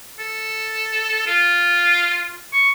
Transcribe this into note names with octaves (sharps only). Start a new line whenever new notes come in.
A4
F4
C#6